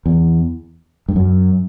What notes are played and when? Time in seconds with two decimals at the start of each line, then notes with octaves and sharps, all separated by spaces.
0.06 E2
1.09 G2
1.16 F#2